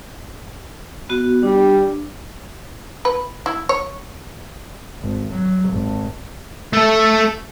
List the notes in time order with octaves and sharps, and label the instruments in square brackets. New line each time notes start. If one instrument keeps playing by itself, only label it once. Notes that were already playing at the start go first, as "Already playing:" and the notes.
[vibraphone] B3 F#4
[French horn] G3 [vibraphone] D4
[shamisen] B4
E4
C#5
[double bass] G#1
F#3
G#1
[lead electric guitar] A3 A4